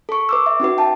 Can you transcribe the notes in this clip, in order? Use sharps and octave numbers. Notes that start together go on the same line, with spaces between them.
A4 C#6
B4 D6 E6
E5
C#4 D#4 F#4 B4
G5 A5